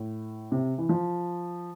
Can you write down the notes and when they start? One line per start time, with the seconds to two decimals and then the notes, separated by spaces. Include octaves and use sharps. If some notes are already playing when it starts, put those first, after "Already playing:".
Already playing: A2
0.52 C3
0.78 E3
0.89 F3